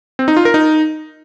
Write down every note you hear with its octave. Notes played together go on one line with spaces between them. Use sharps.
C4
D#4
F4
A#4
D#4